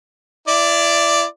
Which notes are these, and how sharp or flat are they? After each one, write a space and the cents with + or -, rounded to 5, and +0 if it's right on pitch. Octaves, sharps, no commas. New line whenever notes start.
E4 +30 D5 +0